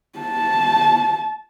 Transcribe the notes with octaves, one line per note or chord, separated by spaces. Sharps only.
A5